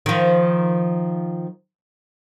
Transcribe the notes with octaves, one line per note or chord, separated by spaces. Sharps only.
D#3 F3